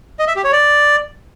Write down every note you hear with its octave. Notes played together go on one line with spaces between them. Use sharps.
D#5
E5
G4
C#5
D5